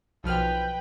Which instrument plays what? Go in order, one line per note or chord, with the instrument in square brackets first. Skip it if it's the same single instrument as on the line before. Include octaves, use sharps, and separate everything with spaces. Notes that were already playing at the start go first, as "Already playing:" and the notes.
[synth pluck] B1 F3 F6 [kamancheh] B4 G5